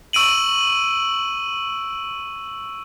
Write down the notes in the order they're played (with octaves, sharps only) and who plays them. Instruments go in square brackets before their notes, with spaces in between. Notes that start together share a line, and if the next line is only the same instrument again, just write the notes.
[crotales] C#6 E6 D7 D#7 F#7